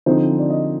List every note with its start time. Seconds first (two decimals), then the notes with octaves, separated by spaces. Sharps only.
0.06 D3 F3 C4 D#4 C5
0.39 D5
0.50 D#5